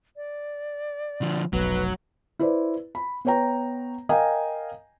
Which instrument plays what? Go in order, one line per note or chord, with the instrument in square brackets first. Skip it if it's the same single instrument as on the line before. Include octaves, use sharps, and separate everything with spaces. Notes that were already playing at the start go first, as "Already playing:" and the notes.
[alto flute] D5
[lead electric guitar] D3 F3
[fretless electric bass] F1 B1 [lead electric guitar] F#3 [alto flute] B4
[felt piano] E4 B4 C5 D5
B5
B3 B4 C#5 G5 A#5
A#4 D#5 F5 G5 G#5 A#5